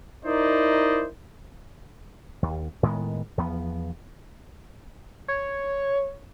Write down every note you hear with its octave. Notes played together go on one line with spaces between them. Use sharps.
D#4 E4 A#4 C5 D5 D#5
D#2
A2 D#3 G#3 B3
E2 F3 B3
C#5